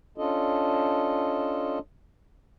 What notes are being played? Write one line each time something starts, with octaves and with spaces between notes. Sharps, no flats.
C#4 D4 F4 A4 D#5